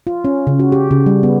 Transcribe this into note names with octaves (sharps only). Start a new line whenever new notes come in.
F4
C#4
C#3
F#4
G4
C#3
G3
B3